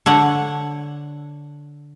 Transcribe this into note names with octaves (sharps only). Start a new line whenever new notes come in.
D3 C#5 F#5